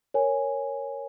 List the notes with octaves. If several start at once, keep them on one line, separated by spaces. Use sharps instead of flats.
A#4 C#5 G#5